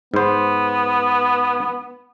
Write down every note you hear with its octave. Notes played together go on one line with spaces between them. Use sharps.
G#2 B3 C5